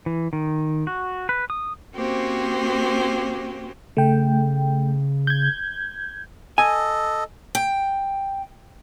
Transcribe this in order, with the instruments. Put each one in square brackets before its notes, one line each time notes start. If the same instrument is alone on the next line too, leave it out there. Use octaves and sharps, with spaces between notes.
[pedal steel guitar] E3
D#3
F#4
B4
D#6
[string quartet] A#3 C4 C#4 F#4 G4 C5
[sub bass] C#3 [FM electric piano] A3 G5
[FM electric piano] G6 G#6
[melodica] A4 D#5 [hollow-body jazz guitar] G#5
[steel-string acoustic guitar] G5